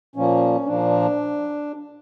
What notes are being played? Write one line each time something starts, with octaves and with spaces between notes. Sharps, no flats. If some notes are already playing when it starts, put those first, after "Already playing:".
A#2 F3 A#3 C#4
A#2 F3 A#3 D4